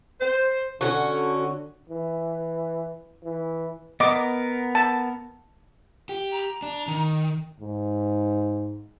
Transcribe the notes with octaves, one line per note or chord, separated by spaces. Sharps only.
C5
D3 C#4 F#4
E3
E3
B3 A#4 D#5 D6
A5
G4
A#5
D4
D#3
G#2